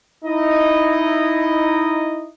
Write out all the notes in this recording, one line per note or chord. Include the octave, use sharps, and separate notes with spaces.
D#4 E4 D#5